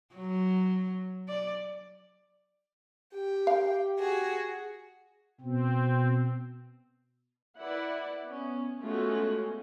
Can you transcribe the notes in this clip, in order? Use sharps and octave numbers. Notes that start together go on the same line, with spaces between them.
F#3
D5
G4 G5
F5
F#4 G#4
B2 C4
E4 B4 D5 F#5
B3 C#4
G#3 A3 B3 C#4 F4 F#4